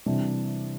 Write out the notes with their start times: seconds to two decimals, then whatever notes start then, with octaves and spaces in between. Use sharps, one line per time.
0.06 C3 E3 G3 D4